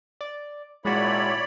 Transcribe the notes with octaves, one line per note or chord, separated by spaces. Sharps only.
D5
G#1 A#2 G#3 E4 F#4 C#5 D5 B5